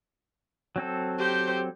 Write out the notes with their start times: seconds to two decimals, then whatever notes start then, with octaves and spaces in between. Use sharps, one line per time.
0.76 F#3 C4 A4
1.18 G4 C5